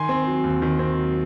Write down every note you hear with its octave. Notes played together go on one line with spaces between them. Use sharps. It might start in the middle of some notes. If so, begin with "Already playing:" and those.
Already playing: D#3 G#5 C6
C4
F#3
D#2
D#3
C4
F#3